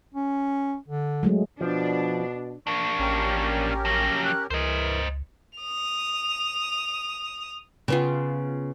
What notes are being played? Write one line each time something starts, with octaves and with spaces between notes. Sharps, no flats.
C#4
D3
F#3 G#3 A3
B2 F3 D4
A#3 D4 C#6
A1 C#4 G4 A#4
F3 F#3 A#6
F#6
C#2 E3 A#4 C5 D#5
D#6 F7
C#3 B3 F4